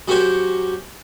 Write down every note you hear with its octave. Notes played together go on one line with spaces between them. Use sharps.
F#3 C#4 F#4 G4 C5 C#5